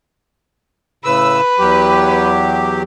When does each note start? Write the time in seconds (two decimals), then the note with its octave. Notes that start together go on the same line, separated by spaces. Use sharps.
1.05 A2 C#3 B4 E6
1.59 E2 F#3 G4